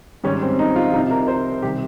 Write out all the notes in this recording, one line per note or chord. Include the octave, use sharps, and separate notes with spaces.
G#2 D#3 G3 C#4
C4
D#4
F4
C2 C3 G3 D#4
A#4
C5
C3 D#3 G3 G4